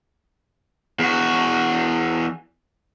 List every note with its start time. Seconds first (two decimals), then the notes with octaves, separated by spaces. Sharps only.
0.99 E2 F#4